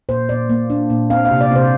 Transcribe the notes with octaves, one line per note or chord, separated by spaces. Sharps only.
A#2 C5
A#2 D5
A#3
D4
A#2
C4 F5
F5
C3
D5
C3 C5